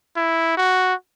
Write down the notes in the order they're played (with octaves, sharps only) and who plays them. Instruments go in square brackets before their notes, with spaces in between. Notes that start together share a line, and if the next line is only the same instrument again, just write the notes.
[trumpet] E4
F#4